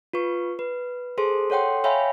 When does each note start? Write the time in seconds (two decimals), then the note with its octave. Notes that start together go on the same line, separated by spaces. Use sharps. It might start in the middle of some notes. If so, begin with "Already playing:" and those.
0.13 F4 B4 C#6
0.59 B4
1.18 G#4 A4 C5 C6
1.50 A4 C#5 F#5 G5 C6
1.84 C#5 E5 F5 G5 G#5 B5